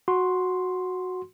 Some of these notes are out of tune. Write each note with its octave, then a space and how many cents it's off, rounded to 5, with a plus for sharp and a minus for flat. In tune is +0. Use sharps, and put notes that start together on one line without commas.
F#4 -10 C6 +0